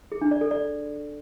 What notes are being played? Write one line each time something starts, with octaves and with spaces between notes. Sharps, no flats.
G#4
D4
D5
A4
D5